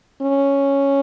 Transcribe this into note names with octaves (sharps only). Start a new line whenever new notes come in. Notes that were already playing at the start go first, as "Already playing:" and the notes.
C#4